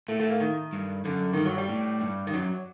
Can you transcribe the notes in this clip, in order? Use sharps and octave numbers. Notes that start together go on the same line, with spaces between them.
A2 A3
A3
A#3
D#3
G2
F#2 D3
G2 D#3
F#3
G3
A2
G2
D#3
F#2 F#3